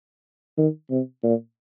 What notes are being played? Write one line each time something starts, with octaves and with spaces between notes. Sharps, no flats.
D#3
C3
A#2